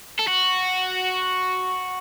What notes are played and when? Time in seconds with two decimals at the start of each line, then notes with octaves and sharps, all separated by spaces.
0.19 A4
0.28 F#4